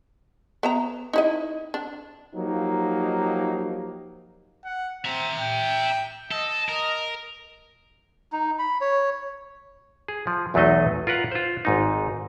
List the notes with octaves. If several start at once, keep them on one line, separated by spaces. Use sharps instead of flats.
B3 E5 A#5
D#4 E4 D#5
D4
F3 F#3 A#3 D#4 G4
F#5
C4 E5 A#5
G5
A4 D#5
A#4
D#4
B5
C#5
G#4
F3
B1 E2 F#3 A3 D#4 D#5
F4 A#4 B4 F#5
F4 C5
G#1 G#2 D#4